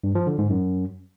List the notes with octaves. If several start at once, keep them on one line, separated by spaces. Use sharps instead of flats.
G2
F3
D3
G#2
F#2